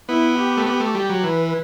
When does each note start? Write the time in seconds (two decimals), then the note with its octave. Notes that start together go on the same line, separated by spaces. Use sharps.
0.09 B3 E4
0.37 G4
0.57 A3
0.66 B3
0.80 A3
0.94 G3 G4
1.10 F#3
1.23 E3 B4